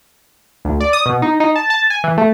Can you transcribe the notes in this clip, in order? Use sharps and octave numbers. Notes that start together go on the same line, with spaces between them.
D2
D5
D#6
B2
D#4
D#4
A5
A5
G#5
E3
A3